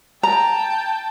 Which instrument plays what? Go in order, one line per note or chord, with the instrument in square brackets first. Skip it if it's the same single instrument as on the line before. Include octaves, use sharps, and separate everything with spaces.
[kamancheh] G5 A5 [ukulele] A#5